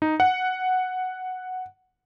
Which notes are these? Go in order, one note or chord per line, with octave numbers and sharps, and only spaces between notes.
D#4
F#5